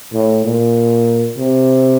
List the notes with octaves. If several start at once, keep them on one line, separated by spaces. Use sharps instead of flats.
A2
A#2
C3